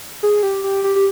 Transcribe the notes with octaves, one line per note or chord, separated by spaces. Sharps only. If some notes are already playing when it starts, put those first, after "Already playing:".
G#4
G4
G4
G4
G4